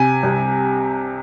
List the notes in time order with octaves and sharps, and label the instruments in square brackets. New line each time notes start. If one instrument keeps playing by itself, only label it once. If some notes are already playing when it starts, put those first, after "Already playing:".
Already playing: [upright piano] C3 [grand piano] G#5
[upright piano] C2